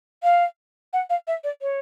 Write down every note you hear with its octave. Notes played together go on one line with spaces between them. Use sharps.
F5
F#5
F5
E5
D5
C#5